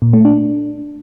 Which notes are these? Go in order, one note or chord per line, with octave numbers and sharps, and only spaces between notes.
A#2
A3
D4